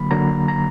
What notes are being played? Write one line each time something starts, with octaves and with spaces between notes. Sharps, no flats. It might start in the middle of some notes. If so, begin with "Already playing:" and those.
Already playing: D3 F#3 A#3 B5
D3 F#3 A#3 A#5
A#5